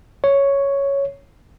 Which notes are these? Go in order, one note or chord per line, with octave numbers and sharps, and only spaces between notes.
C#5